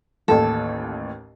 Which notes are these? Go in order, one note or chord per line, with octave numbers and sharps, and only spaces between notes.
A1 D#2 A4